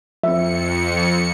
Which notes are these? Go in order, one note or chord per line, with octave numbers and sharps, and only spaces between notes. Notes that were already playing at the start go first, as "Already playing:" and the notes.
F2 F3 C4 E5 C#7